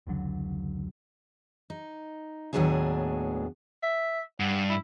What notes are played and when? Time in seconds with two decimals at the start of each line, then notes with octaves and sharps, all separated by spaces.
0.07 F1 C#2 D3 F#3
1.70 D#4
2.53 D#2 A2 F#3 B3 D4 G#4
3.83 E5
4.40 G2 F#5
4.70 E4